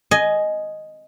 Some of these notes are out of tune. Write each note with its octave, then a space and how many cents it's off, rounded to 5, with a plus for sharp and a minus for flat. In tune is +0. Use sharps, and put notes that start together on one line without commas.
D#5 +0 G#5 +15